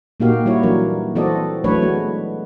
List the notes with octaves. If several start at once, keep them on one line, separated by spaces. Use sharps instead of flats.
A#2 A#3 D#4 F#4 G4 F5
G3 E4 F#4 C#5
E3 F#3 D4 A#4
E3 C4 F#4 A4 D5 D#5
E3 F#3 A3 D4 B4 C#5
G#3 B3 F#4